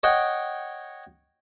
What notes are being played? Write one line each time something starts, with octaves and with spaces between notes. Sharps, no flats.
C#5 D#5 F#5 G5